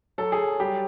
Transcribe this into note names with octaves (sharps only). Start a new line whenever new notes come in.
F#3 A4
G#4
F#3
G3 G4